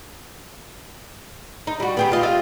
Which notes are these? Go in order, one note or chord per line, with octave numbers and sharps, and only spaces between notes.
D#4
G3 F#4
B3 G4 G#4
F4 D#5
F4 D#5 E5